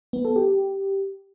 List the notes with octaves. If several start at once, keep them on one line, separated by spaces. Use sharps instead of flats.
B3
A4
G4